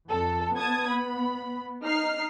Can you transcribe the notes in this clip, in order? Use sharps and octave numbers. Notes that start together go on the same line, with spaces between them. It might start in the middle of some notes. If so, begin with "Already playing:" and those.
F2 A4
B3 A5 D#6 G#6
B5
D#4 F6 C7